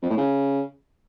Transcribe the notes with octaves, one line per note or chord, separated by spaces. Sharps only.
F2
A2
C#3